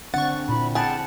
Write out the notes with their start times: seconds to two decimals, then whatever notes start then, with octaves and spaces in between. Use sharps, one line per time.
0.14 D3 C4 D4 F#5 C#6 A6
0.49 A#2 C4 E4 B5
0.75 G4 G#4 F#5 A5 A6